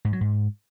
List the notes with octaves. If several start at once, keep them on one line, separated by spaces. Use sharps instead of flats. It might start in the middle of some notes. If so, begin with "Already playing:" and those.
G#2
F#3
G#2